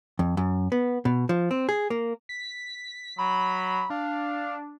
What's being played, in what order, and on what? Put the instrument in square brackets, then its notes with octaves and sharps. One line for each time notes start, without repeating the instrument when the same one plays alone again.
[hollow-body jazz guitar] F2
F#2
B3
B2
F3
C4
G#4
A#3
[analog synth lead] B6
[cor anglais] F#3 [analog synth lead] B5
[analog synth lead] D4 [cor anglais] F5